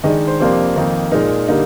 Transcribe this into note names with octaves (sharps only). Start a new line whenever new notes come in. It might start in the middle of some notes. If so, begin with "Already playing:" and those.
D#3 G#3 D4 D#5
C5
F2 C3 F3 A#3 D4 C5
F2 D#3 A#3 D#4
A#2 G#3 D#4 A#4
D3 G3 A#3 D#4